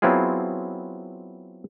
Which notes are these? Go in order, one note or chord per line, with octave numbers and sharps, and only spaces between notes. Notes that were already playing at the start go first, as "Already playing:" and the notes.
F#3 B3 C4 E4 F4 G#4